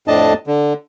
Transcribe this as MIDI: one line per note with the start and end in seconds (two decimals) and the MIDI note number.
0.08 0.33 41
0.08 0.33 45
0.08 0.33 62
0.08 0.33 75
0.08 0.33 81
0.47 0.73 50